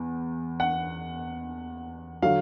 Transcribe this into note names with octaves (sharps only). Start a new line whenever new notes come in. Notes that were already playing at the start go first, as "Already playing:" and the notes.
Already playing: E2
F#5
D3 F#3 F5